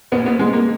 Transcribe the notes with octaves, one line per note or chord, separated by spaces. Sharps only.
A#1 A#2 B3
B3
G#3
A#3